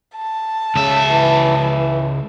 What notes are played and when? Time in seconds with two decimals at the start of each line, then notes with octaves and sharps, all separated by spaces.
0.17 A5
0.76 C#2 C#3 E5
1.09 E3
1.58 E3